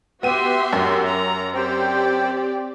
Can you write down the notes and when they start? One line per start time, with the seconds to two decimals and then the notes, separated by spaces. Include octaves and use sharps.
0.23 B3 F#4 G4 E5 C6 D#7
0.73 F#2
1.10 A#5
1.54 C4 G4 C5 D5 G5